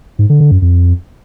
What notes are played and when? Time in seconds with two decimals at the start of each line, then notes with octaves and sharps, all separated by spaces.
0.19 G#2
0.30 D3
0.40 D3
0.51 F#2
0.62 F2